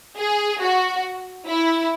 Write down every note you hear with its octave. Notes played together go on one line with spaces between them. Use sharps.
G#4
F#4
E4